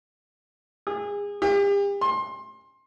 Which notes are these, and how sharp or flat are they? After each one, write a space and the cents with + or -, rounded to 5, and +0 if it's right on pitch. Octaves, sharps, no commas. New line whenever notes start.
G#4 -30
G4 +40
C6 +25